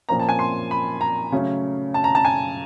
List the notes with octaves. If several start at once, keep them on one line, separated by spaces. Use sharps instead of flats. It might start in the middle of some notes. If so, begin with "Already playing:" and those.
A#2 F3 A#3 C#4 A#5
A5
G#5
C6
B5
A#5
C#3 F#3 A3 C#4
A5
A#5
A5
G#5